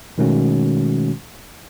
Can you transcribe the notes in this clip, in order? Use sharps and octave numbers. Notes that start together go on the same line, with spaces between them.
B2 D#3 G#3 A3 C#4 F#4